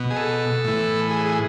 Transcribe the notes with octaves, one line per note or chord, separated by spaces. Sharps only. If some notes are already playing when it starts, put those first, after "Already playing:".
Already playing: B2
G#4
A4
A2 E3
G#4
G#4